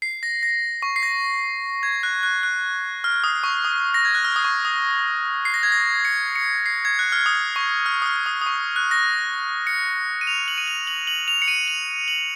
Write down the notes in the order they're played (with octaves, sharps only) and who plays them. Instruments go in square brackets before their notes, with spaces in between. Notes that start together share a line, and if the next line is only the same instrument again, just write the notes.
[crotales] C7
A#6
A#6
C#6
C7
A#6
G#6
F#6
F#6
F#6
F6
D#6
C#6
D#6
A#6
G#6
F#6
F6
D#6
C#6
D#6
C7
A#6
G#6
A#6
C#7
C#7
C7
G#6
F#6
F6
D#6
C#6
F6
D#6
F6
D#6
D#6
C#6
F#6
A#6
C#7
D#7
F7
F#7
D#7
F7
F#7
F#7
F7
C#7
D#7
F7
F#7